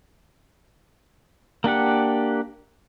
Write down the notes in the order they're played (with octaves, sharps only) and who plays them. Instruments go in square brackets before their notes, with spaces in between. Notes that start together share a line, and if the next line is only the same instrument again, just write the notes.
[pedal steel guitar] A#3 D4 G4 F#5